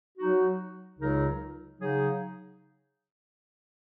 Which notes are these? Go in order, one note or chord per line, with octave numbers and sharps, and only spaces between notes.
F#3 D#4 F#4
C#2 C#3 F#3 D#4 A#4
C#3 F#3 D#4 G#4